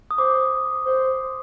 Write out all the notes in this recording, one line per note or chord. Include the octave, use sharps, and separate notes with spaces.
D#6
C5 D6
C5